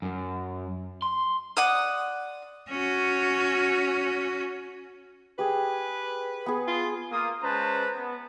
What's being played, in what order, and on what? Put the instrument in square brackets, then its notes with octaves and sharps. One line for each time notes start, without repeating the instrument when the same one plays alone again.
[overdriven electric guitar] F#2
C6
[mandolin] D5 F#5 D#6
[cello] C#4 F#4
[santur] G4 G#4 D#6 [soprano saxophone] B4
[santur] B3 G#4
[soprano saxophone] F4
[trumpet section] A#3 F4 D#6
G#3 C#4 B4 C5 A5 A#5
B3